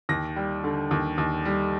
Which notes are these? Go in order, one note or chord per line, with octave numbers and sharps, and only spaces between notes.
D#2 A#6
G3
D3
D#2
D#2
G3